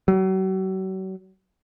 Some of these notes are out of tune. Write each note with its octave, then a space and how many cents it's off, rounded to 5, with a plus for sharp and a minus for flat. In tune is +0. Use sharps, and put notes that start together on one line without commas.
F#3 +40